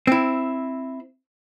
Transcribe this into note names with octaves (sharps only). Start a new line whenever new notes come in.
C4 E4